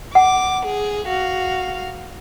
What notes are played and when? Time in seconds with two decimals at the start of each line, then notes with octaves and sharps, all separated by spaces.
0.15 F#5 D6
0.66 G#4
1.06 F#4 F5